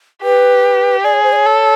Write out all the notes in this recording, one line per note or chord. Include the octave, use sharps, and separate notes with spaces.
G4 B4
G#4 D5
C#5
C5
D5
C#5
A4